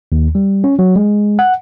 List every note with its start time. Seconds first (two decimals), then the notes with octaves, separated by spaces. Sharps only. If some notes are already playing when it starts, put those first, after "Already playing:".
0.12 D#2
0.35 G3
0.64 C#4
0.79 F#3
0.96 G#3
1.39 F#5